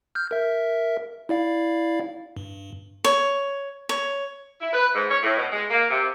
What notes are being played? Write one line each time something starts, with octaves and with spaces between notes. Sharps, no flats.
F6 G6
A#4 E5
E4 D5 F5
G2
C#5
C#5
E4
B4
G#2
C#5
A2
B2
G#3
A#3
C3